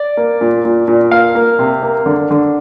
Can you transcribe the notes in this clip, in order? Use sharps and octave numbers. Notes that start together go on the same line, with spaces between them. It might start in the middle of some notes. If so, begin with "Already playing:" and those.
Already playing: D5
A#3
A#2
A#2
A#2
A#3 F5
A#3
C3
A#3
D3
D3